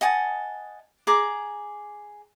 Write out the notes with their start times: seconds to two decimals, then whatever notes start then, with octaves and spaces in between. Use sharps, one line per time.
0.01 D#5 F#5 G#5 A5
1.07 G#4 A#5 D6